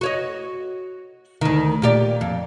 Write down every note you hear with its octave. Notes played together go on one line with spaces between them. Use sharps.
F#4 C#5 D#5
D2 D#3
A#2 G4 D5
F2